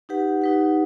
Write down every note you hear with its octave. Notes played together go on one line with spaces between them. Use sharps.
D#4 G4 B4 F#5
D#4 G4 B4 F#5